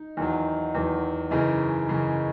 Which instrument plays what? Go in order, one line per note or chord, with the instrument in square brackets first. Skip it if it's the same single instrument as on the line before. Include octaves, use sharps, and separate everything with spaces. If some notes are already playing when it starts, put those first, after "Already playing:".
Already playing: [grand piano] D#4
E2 D#3 F#3
E2 D#3 F#3
F#2 C#3 E3 D#4
F#2 C#3 E3